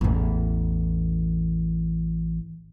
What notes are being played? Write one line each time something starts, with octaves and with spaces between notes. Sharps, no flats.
A1 E2